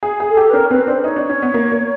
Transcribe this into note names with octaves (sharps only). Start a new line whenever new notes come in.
G#4
G#4
A4
G4
B4
C#4 A#4
C4 B4
D4 C5
D#4 C#5
D4
C#4
B3
A#3
A#3